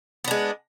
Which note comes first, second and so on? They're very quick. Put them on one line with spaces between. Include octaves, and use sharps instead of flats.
B3 D4 G#3